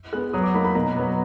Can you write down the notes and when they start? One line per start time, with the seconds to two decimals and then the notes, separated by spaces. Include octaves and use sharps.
0.13 G#3 B3 F#6
0.34 F#3 D#6
0.44 D6
0.54 A#3 D#4 B5
0.65 B5
0.75 B2 A#5
0.96 F#3 B3